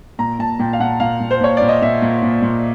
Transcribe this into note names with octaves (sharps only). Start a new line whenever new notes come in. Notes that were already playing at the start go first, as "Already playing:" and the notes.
A#2 A#5
A#2 A5
A#2 G5
F5
A#2 F#5
A#2 F5
A#2
C5
A#2 C#5
A#2 D5
D#5
A#2 E5
A#2
A#2
A#2